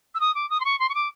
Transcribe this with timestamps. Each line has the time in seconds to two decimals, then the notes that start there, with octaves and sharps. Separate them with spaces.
0.15 E6
0.20 D#6
0.35 D6
0.50 D#6
0.60 C6
0.65 C#6
0.80 C6
0.89 C#6
0.95 D6